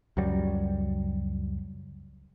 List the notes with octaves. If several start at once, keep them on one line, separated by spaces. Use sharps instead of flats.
C#2 F#2 F#3 G3